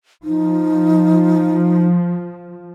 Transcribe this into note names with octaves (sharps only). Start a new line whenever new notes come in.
F3 D#4